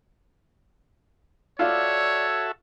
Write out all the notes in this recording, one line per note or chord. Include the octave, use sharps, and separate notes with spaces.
F4 F#4 A4 C#5 D5 E5